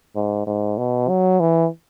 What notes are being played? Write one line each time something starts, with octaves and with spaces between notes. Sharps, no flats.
G#2
G#2
B2
F#3
E3